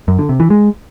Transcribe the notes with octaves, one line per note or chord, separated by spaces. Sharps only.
F#2
D3
C3
E3
G#3